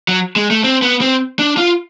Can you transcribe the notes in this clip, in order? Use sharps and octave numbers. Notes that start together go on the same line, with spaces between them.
F#3
G#3
A3
C4
B3
C4
D4
F4